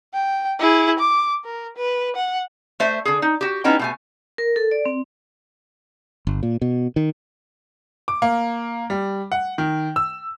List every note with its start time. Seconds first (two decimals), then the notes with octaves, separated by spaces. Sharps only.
0.13 G5
0.59 E4 G#4
0.99 D6
1.45 A#4
1.77 B4
2.16 F#5
2.80 A3 C5 E5
3.05 D3 G#4
3.22 D#4
3.41 F#4 G4
3.64 B3 C#4 D#4 E4 G5
3.79 B2 A3 G#5
4.38 A#4
4.56 A4
4.71 D5
4.86 C4
6.27 G1
6.43 A#2
6.62 B2
6.96 D#3
8.08 D6
8.22 A#3
8.90 G3
9.32 F#5
9.58 D#3
9.96 E6